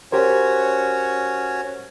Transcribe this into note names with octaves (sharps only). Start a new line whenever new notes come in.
C#4 F#4 G4 A#4 C5 C#5